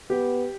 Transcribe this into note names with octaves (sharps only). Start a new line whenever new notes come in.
B3 G4